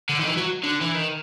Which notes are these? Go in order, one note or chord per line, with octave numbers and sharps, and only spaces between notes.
D3
D#3
E3
F#3
D3
E3
D#3